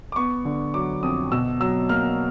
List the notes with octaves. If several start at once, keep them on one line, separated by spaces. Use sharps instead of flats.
D6
B3 C#6
D3
F#3 D6
F2 D#6
B2 E6
F#3 E6
A#3 F6